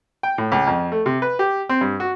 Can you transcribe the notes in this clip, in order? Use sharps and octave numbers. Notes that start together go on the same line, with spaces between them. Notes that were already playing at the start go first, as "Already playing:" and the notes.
G5
A2
C#2
F2
A3
C3
B4
G4
C4
G2
F#4